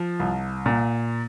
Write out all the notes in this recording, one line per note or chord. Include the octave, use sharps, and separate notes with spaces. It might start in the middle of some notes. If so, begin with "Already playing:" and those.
Already playing: F3
C2
A#2